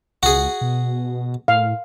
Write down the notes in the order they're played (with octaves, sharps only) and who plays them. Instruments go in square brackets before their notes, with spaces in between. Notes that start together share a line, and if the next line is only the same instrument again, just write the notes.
[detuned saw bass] C#2 [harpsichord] F#4 G#4
[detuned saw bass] B2
[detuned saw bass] A2 [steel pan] F5